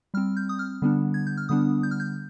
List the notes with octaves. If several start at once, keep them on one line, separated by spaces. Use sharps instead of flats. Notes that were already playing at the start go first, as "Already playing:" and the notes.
G3 C4 F6
G6
D#6
F6
D3 G3 B3 D4
G#6
G6
F6
D3 G3 B3 D4 D#6
G6
F6
G6